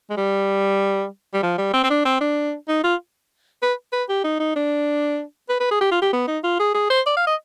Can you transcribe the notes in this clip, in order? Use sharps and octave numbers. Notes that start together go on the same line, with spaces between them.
G#3
G3
G3
F3
G3
C4
C4
D4
C4
D4
D#4
F4
B4
B4
G4
D#4
D#4
D4
B4
B4
G#4
G4
F4
G4
B3
D#4
F4
G#4
G#4
C5
D5
F5
D#5